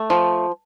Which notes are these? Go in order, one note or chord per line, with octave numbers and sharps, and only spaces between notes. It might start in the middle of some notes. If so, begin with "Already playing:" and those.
Already playing: A3
F3